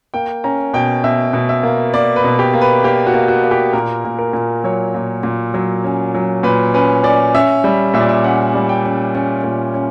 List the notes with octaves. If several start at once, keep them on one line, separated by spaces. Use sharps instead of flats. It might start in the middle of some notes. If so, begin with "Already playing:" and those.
A#3 G5
C#4 A#5
B2 G5
B2 E5
B2
E5
A#3
A#3 D5
B4
B2
G4
A#3
B4
A#3 G4
F#4
A#3
F#4
A#3
G4
A#2 A#4
A#2
A#4
A#2
F#3 C#5
A#2
A#2
F#3
C#4
F#3
A#2 B4
C#4 B4
C#4 D5
C#4 E5
G3
A#2 E5
D5
E5
C#4 F#5
G3
G5
C#4
C#4
A#2
C#4